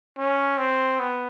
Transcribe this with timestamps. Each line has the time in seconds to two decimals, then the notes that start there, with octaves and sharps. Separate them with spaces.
0.17 C#4
0.58 C4
0.99 B3